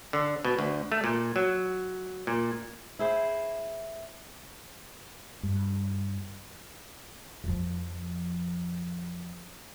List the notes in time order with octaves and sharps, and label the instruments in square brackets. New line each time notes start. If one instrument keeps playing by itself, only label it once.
[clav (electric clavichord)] D3
B2
D2
A3
A#2
F#3
A#2
[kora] E4 G#4 C5
[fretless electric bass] G2
[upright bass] F2 F3